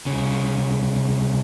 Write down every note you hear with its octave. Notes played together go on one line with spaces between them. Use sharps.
C2 C#3